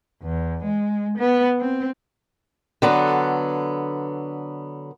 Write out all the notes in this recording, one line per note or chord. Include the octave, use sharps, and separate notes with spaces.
E2
G#3
B3
C4
D3 F#3 B3 A4